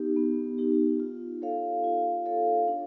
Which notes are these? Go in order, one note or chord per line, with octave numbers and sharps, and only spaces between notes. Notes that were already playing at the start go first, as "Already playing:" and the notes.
Already playing: B3 D#4 G4
B3
D#4 G4
F4
A4 C#5 F5
F4
A4 C#5 F5
D4